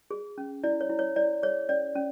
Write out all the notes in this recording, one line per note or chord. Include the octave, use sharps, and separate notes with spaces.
G#4
C#4
E4 D5
C#5
E4
C#5
E4 D5
G#4 C#5
C#4 D5
C#4